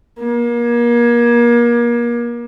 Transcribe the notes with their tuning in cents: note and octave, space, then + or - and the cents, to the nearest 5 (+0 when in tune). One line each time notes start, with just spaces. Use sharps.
A#3 +35